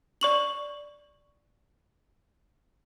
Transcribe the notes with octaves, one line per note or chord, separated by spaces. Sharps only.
D5 C#6 F#7